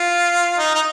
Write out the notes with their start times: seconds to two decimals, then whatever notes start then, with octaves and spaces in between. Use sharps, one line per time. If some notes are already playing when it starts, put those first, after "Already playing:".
Already playing: F4
0.58 D#4
0.75 D#4